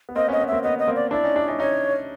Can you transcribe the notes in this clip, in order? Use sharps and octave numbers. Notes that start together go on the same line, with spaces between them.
B3
A#3 C4 D#5
B3 C#4 D#5
B3
A#3 C4 E5
B3 D#5
D#5
A#3 C4
D5
D4 E4 D5
C#4 D#4
D4 E4
C#4 D#4
C#4 D#4 C#5